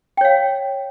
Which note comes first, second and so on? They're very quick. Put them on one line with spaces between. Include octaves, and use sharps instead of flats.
G5 C#5 F5